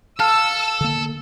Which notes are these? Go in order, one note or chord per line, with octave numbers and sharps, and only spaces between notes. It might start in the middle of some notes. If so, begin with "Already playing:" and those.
A4 F5 A5 E6 F6
D3 A#3